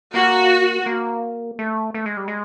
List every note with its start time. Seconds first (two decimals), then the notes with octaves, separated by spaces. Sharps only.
0.14 A#3 F#4
0.86 A#3
1.59 A3
1.94 A3
2.06 G#3
2.17 G3
2.28 G#3